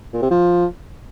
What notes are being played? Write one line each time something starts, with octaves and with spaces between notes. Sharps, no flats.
A#2
C3
F3